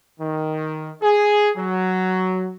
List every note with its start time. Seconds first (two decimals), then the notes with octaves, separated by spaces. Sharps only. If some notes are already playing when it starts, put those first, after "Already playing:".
0.20 D#3
1.02 G#4
1.57 F#3